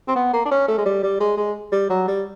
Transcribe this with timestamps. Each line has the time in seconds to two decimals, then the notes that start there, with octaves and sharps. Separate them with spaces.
0.08 C4
0.15 B3
0.33 A#3
0.45 D4
0.51 C#4
0.68 A3
0.78 G#3
0.86 G3
1.03 G3
1.20 G#3
1.37 G#3
1.72 G3
1.89 F#3
2.07 G3